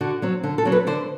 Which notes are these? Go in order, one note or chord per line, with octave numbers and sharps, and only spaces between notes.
D3 F#4
F#3 C4
D3
A4
F#3 C4
B4
D3 C5